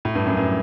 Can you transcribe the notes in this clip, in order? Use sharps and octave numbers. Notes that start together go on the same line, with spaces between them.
A2
G2
F#2
G2